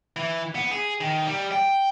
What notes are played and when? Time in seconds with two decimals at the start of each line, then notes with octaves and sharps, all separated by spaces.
0.16 E3
0.55 B3
0.71 G#4
1.01 D#3
1.27 G3
1.52 G5